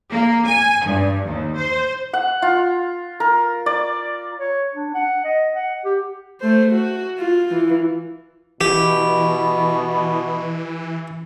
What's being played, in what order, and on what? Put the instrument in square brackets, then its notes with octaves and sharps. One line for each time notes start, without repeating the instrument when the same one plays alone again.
[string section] A#3
G#5
G2
D#2
C5
[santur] F#5
F4
A#4
D5
[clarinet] C#5
D4
F#5
D#5
F#5
G4
[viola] A3 C5
F#4
F4
E3
[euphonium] B2 [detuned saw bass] E3 [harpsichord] G4